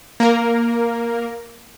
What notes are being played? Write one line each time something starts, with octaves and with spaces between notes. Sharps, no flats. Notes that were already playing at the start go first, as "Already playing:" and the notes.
A#3 A#4